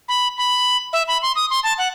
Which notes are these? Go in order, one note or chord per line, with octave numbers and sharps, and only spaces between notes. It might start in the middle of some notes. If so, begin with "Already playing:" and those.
B5
B5
E5
B5
C6
D#6
C6
A5
F#5